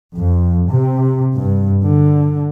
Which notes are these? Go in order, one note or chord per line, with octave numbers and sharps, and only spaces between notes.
F2
C3
G2
D3